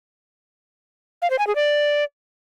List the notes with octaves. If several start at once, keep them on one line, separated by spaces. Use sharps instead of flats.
F5
C5
G#5
G#4
D5